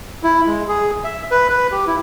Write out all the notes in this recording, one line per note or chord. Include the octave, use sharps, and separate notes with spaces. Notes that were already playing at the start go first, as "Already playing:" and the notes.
E4
G#3
G#4
E5
B4
B4
G4
E4